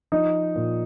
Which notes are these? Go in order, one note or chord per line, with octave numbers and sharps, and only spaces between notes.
F3 D#4
A#2